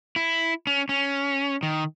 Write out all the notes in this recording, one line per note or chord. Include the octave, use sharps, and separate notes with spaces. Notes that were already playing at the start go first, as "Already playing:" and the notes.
E4
C#4
C#4
D#3